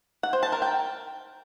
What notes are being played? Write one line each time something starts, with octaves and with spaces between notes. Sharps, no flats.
F#5
C5
A5
A#4
G5